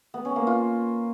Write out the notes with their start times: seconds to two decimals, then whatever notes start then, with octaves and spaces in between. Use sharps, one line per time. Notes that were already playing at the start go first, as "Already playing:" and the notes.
0.14 B3
0.25 C#4
0.36 A#3
0.47 F4